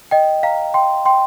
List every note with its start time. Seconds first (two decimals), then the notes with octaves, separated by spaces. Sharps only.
0.11 D#5 G5
0.43 F5 A#5
0.74 G5 C6
1.05 G5 C6